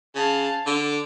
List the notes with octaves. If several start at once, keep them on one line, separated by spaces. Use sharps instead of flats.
C#3 F5 A5
D3 D6